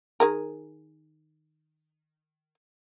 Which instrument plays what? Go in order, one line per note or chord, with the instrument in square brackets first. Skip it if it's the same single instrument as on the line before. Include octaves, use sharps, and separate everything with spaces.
[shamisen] D#3 G#4 A#4